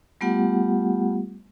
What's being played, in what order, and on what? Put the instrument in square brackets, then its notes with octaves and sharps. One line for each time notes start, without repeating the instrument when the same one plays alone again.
[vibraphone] G3 A3 B3 F4 G4 F#5